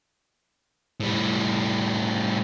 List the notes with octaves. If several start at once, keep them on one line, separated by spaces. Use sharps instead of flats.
A2 G3